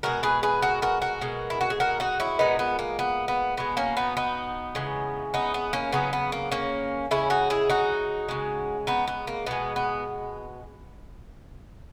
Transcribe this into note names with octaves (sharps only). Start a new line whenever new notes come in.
B2 G#3 F#4 A#4
G#4 B4
G#4 B4
F#4 A#4
F#4 A#4
F#4 A#4
B2 G#3
E4
F#4
G#4
F#4 A#4
D#4 F#4
C#4 E4
A#2 G#3 B3 D#4
B3
A#3
B3
B3
B2 G#3 B3
A#3 C#4
B3 D#4
B3 D#4
C#3 E3 G#3
B3 D#4
B3
A#3 C#4
C#3 F#3 B3 D#4
B3
A#3
A#3 C#4
C#3 G#3 C#4 E4
D#4 F#4
E4 G#4
D#4 F#4
C#3 G#3
B3 D#4
B3
A#3
B2 G#3 B3
B3